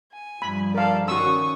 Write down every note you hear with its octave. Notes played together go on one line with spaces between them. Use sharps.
G#5
G2 F3 B5
A4 A#4 D5 F5
D#3 C#4 F#4 C#6 D#6 E6